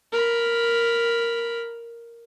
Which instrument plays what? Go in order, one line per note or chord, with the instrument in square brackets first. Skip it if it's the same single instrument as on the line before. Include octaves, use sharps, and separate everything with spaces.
[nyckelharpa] A#4 B5